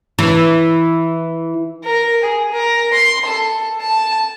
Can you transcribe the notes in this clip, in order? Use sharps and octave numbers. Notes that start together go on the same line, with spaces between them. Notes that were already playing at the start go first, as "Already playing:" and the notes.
E3
A#4
G#4
A#4
C6
A4
A5